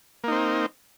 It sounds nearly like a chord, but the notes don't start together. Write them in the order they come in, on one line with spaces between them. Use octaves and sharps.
A#3 D#4 C4